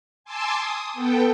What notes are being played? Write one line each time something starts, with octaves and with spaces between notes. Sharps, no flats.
G#5 A5 C6 D6 E6
D#6
B3 A4 G5